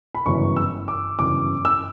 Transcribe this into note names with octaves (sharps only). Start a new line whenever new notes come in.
B5
G1 F#2 C#3 E3 C#6
E6
D6
G1 F#2 C#3 E3 D6
E6